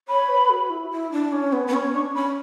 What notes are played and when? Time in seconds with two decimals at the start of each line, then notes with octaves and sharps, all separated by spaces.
0.08 C#5 B5
0.29 B4
0.50 F#4
0.70 E4
0.91 E4
1.12 D4
1.32 C#4
1.53 B3
1.67 B3
1.74 C#4 C#6
1.94 D4 C#6
2.15 C#4 B5